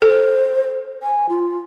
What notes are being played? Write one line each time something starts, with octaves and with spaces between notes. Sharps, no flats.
A4 C5
G#5
F4